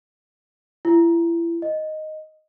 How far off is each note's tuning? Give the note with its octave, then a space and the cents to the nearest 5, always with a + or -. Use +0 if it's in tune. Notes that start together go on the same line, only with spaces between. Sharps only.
E4 +35
D#5 +0